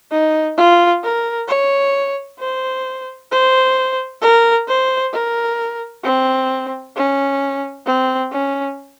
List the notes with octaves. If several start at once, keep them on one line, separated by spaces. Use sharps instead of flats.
D#4
F4
A#4
C#5
C5
C5
A#4
C5
A#4
C4
C#4
C4
C#4